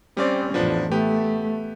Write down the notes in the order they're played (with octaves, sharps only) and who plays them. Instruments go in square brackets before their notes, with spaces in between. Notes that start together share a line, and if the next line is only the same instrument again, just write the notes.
[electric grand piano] G3 C#4 D5 [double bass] C4
[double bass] A1 F2 [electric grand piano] F3 B3 D4
[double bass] A3 [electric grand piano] B3 G4